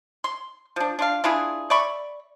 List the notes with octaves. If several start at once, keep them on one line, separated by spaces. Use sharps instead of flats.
C6
F3 D4
D4 F4 F5
D4 E4 F4 G#4
D5 E5 B5 C#6